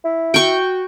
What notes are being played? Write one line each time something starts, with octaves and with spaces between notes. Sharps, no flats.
E4
F#4 G5 C#6